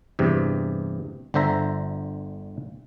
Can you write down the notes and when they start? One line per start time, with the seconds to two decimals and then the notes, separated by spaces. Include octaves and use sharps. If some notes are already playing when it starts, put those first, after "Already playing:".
0.19 E2 G2 C3
1.34 G1 D3 C5 E5 A#5